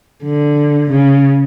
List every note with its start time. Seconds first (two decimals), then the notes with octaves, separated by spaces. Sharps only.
0.24 D3
0.90 C#3